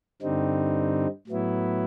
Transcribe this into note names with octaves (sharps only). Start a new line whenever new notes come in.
G2 D3 G3 C4 D#4
A2 F#3 B3 E4